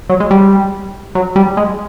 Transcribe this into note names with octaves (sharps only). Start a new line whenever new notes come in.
F#3
G#3
G3
F#3
G3
G#3